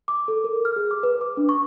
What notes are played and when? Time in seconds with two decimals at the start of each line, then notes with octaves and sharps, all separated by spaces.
0.08 D6
0.28 A4
0.44 A#4
0.65 F6
0.76 G#4
0.91 D6
1.03 B4
1.21 D6
1.37 D4
1.49 C#6